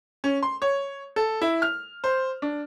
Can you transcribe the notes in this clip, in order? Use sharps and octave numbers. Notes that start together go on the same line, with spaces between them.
C#4
C6
C#5
A4
E4
F6
C5
D4